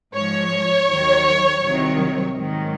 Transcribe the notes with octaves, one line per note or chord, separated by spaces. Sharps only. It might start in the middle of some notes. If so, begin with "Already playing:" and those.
G#2 F3 C#5
D#2 D#3 F#3
C2 C3 D#3 F#3
G#2 D#3 F#3